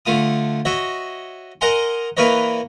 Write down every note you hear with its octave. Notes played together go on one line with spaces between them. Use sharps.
D3 A3 F4 D#6
F#4 C#5 D#5 E5
A#4 D#5 F#5 G#5 A#5 C6
E3 A#3 A#4 B4 C#5 D#5